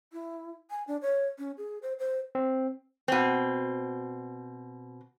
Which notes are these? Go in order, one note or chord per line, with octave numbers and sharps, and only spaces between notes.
E4
G#5
D4
C#5
C#4
G#4
C5
C5
C4
B2 C4